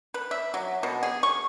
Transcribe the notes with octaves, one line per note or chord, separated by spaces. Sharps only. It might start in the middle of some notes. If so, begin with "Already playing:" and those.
B4
E5
F#3
B2
G#4
C#6